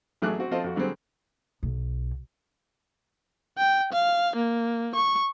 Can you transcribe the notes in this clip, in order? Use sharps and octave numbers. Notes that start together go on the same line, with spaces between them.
A1 F#3 A3 G#4 D6 F#6
C4 F#4
F3 C4 F4 A4 D#5
F2 F#4
D3 F#3 G3 C4 G#4
B1
G5
F5
A#3
C#6